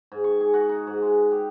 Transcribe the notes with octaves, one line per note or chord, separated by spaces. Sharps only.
G#2
C#6
G#4
F#4
D#4
G#2
G#3
G4